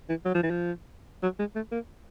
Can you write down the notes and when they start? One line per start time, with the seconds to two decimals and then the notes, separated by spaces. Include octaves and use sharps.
0.09 E3
0.25 F#3
0.34 F3
0.43 E3
0.51 F3
1.23 F#3
1.39 G#3
1.56 A3
1.71 A#3